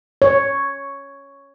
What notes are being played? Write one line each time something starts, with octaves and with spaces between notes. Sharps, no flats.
C#5